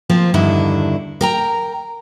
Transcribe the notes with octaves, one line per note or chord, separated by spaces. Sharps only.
F3 A#3 C4
E2 G2 D3 D#3 E4
A#4 G5 A#5